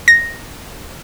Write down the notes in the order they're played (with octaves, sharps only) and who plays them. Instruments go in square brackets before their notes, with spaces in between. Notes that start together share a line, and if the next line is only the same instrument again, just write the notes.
[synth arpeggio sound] A#6